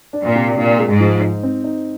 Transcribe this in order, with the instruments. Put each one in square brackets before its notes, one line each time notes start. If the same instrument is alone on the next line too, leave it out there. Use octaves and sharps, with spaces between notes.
[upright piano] D4
[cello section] A#2
[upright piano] C3
[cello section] A#2 [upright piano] D4
[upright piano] G#3
[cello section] G#2
[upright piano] F3
D#4
C4
D#4